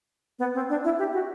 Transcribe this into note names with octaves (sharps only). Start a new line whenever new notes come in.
B3
C4
D4
E4
G4
F#4